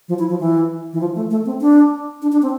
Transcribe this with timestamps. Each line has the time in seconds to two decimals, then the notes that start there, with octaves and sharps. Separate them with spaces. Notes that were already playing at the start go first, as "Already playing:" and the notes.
0.08 F3
0.19 E4
0.29 F3
0.39 E3
0.93 E3
1.00 F3
1.15 A3
1.30 A3
1.45 C4
1.61 D4
2.22 D4
2.32 D4
2.42 C4